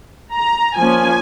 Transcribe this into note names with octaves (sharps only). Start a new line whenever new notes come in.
A#5
F3 A#3 C#4 G#5